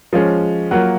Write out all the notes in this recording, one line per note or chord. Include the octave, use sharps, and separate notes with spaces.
F3 G#3 C#4
F#3 A#3 F4 F#5